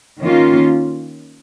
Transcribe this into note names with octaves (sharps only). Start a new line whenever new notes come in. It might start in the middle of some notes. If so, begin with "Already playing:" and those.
D#3 A#3 C#4 F4